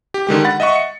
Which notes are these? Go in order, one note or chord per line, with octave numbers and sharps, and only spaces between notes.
G4
D3 D#3 G#3 G4
F#5 B5 A6
D#5 E5 F#5 C#6
C#7